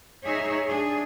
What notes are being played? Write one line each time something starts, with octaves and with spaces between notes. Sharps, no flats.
D#4 G#4 C#5 E5
D4 G#4